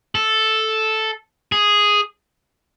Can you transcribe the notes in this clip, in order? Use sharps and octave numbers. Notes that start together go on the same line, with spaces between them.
A4
G#4